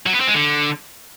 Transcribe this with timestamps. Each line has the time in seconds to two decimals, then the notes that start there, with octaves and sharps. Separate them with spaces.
0.07 F#3
0.14 B3
0.21 C4
0.28 G#3
0.35 D3